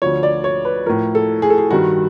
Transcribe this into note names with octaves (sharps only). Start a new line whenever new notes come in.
D2 D3 F3 C#5
D5
C#5
B4
A2 F3 A#4
A4
G#4
A4
G#4
G2 D#3 G3 F#4